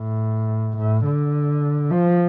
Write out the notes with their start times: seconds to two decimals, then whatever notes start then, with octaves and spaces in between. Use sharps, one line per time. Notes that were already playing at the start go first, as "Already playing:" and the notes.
Already playing: A2
0.77 A2
1.05 D3
1.91 F3